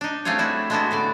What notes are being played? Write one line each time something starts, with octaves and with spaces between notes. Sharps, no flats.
D4 D#4
A3 C4 F4 G#4 C#5
D4 E4 F#4
G#3 A3 B3 D4 E4 F#4
A2 D3 D5